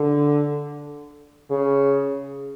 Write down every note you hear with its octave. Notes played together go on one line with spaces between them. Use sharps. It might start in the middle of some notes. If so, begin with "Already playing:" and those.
Already playing: D3
C#3